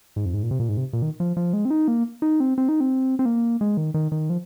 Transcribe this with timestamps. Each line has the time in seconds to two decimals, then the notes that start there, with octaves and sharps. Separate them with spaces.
0.16 G#2
0.26 F2
0.34 G#2
0.43 A#2
0.51 C3
0.60 A#2
0.69 G#2
0.77 C3
0.93 A#2
1.02 D#3
1.20 F3
1.37 F3
1.53 G#3
1.65 C4
1.70 D#4
1.88 A#3
2.22 D#4
2.40 C4
2.58 C4
2.69 D#4
2.80 C4
3.19 C4
3.26 A#3
3.61 G#3
3.77 D#3
3.94 D#3
4.12 D#3
4.30 F3